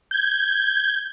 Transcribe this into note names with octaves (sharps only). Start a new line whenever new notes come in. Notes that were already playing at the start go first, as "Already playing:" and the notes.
G6 G#6